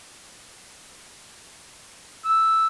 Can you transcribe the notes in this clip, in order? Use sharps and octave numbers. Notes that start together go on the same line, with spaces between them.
E6